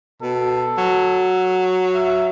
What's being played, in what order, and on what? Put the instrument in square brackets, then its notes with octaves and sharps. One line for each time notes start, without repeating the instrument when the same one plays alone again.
[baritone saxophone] B2 [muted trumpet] A4
[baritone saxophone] F#3
[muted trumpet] E5